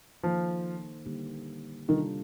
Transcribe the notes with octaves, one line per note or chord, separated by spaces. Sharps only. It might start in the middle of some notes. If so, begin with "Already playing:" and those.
D#3 F3 A#3 D#4 A4 C5
D3 G3 A#3 D#4 G4
C3 D#3 G3 D4 F4 A4